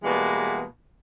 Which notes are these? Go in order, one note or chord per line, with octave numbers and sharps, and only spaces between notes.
B2 E3 G3 G#3 A#3 B3